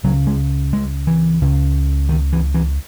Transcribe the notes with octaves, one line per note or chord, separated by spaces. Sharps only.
C#2 C#3 F#3
G#3
G#3
E3
C#2 C#3
D#3
E3
E3